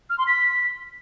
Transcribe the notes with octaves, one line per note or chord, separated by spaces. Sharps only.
F6
C6
B6